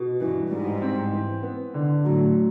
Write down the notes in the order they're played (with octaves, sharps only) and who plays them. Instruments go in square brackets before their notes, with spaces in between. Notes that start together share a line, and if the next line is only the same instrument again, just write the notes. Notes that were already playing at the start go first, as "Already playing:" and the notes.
Already playing: [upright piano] B2
[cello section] G2 [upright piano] E3
[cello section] G#2 [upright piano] G3
[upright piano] C4
E3
B3
D3
[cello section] A2 [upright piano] F#3